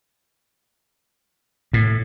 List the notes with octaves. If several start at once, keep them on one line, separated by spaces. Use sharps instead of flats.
A2